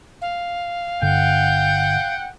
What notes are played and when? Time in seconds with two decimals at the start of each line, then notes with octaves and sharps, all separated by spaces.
0.21 F5
1.02 G1 G2 D3 F#5 G5 G6